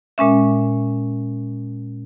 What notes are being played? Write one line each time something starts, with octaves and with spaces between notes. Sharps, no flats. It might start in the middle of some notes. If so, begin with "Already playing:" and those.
A#2 G#3 C#4 E5